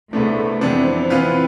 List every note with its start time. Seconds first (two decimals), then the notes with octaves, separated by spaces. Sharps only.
0.13 C2 C3 G#3 A3 B3 D4
0.61 F2 C3 E3 B3 C4 D4
1.10 E3 B3 F4 B4